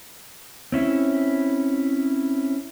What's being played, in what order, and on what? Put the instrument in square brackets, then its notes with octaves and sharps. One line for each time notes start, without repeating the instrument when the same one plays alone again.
[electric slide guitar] C4 C#4 E4